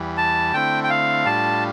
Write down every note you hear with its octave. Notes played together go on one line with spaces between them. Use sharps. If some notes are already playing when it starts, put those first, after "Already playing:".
Already playing: E2 E3 G3
A5
D3 A3 C4 E4 G5
G5
F5
A2 G3 D4 F4 A5